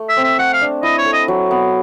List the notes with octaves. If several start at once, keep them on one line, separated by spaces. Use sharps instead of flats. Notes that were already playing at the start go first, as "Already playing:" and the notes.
Already playing: A3
E5
C4
E5
A3 F#5
F5
D4
E4 D#5
C#5
A4
D#5
F#3
B3